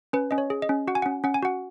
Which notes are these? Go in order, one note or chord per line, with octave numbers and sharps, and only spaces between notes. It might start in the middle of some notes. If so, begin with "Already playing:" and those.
C#4 B4
C#4 D#5
C#5
G#4
D#5
C#4
F#4 F#5
G#5
C#4 F#5
C#4 F#5
G#5
F#4 F#5